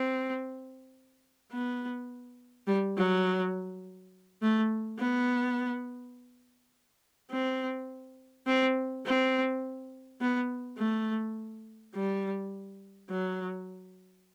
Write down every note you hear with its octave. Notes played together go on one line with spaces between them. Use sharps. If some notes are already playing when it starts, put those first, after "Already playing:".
Already playing: C4
B3
G3
F#3
A3
B3
C4
C4
C4
B3
A3
G3
F#3